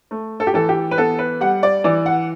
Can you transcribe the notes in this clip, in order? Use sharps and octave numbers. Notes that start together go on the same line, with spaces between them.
A3
A4
G4
E3 A4
G4
B4
B3 A4
B4
G3 F#5
D5
E3 D5
F#5